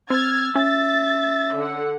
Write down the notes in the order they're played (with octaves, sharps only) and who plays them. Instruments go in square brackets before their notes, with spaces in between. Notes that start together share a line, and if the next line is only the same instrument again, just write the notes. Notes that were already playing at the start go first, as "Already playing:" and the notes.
[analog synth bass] C4 [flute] E6 [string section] F6 G#6 A6
[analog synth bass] C#4 [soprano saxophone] E5 [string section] A6
[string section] D3 F#5